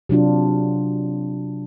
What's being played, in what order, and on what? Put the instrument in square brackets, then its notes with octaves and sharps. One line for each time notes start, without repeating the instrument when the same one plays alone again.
[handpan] C3 F#3 D4 F4